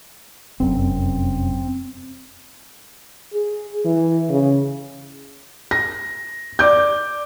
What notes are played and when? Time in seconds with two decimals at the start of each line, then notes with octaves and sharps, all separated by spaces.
0.60 F1 F#2 C4
3.34 G#4
3.85 E3
4.29 C#3
5.71 A#6
6.59 D5 D6 G6